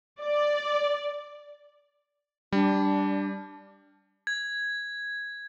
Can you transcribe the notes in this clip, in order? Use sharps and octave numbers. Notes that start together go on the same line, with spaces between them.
D5
G3 D4
G#6